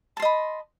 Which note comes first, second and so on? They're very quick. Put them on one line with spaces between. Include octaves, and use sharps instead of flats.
A5 C6 D#5 B5